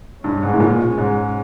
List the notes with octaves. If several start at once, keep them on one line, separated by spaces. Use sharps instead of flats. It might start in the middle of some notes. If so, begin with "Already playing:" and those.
G2 B2 G#3 C#4
G#2
A2
A#2
G#2